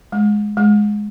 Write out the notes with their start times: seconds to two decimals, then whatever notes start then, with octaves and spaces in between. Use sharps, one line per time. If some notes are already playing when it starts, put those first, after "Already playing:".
0.12 G#3
0.57 G#3